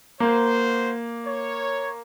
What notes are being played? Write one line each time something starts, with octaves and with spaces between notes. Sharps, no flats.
A#3 F#4 C5
C#5